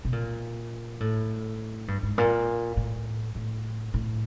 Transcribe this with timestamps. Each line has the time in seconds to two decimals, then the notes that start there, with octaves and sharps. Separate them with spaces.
0.05 B2
0.13 A#2
1.00 A2
1.88 G2
2.03 G#2
2.18 A#2
2.77 A2
3.35 A2
3.94 A2